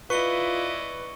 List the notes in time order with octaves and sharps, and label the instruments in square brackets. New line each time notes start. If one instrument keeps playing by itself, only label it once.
[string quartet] E4 D5 D#5 [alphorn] F4 [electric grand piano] B4 [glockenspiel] C#6 C#7 G7